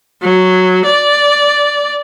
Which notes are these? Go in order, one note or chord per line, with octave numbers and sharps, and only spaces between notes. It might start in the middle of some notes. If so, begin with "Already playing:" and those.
F#3
D5